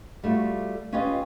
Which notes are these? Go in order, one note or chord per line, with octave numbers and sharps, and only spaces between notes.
G3 A3 F4 F#4
C#4 F4 G4 B4 D#5